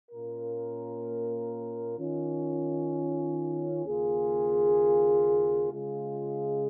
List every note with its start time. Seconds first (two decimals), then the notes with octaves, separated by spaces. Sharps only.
0.11 A#2 A#3 C#4 F4 A#4
1.98 D#3 C#4 F4
3.84 D#2 C#3 A#3 F4 G#4
5.71 C#3 G#3 F4 G#4